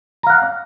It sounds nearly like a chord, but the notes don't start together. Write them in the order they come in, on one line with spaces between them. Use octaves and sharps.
A#5 F5 F#5